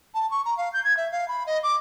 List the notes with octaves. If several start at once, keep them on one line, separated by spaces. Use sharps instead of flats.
A5
C#6
A#5
F5
G6
G#6
E5
F5
B5
D#5
D6